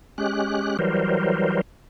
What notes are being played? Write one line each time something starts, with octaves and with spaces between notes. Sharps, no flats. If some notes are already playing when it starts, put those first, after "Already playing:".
G#3 C#4 G4 F#6
E3 F#3 G3 A#4 C5